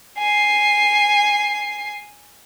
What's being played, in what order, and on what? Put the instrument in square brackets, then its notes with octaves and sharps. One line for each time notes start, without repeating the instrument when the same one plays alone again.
[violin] G#5 C7